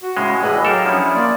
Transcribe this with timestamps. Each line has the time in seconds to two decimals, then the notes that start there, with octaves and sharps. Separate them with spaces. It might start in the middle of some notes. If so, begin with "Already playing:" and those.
0.03 F#4
0.17 A2 C#3 G#3
0.43 E2 A2 E3 G#4 D#5 B5
0.65 F#3 G4 A4 A#4 F5
0.85 F3 C#4 D4 E4 G#4
1.14 A#3 F4 D5